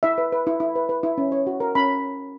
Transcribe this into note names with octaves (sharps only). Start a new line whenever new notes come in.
E4 E5
B4
B4
E4
E4
B4
B4
E4
C#4
C#5
F#4
A#4
C#4 B5